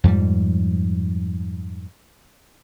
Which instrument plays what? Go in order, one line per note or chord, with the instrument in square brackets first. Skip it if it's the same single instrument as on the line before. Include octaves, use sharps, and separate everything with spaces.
[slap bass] F2 G#2 F3 G3